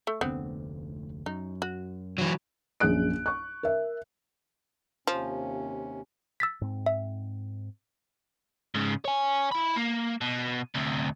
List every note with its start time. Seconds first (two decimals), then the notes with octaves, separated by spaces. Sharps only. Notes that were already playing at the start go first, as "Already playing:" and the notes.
0.07 A3
0.21 F1 D2 D3 B3 C4 F#5
1.26 F#2 D#4
1.62 F#4
2.18 E3 F#3
2.80 A#1 F#2 G#4 F#6 D7
3.26 C#6 F#6
3.63 A#4 E5
5.07 D#2 C3 F3 C#4
6.40 E6 A6 B6
6.61 G#2 C4
6.86 E5
8.75 G#2 C#3
9.05 C#5 G#5
9.51 E4 B5
9.76 A#3
10.21 B2
10.75 D2 C3